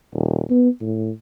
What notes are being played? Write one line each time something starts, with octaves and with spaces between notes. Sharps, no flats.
D#1
B3
A2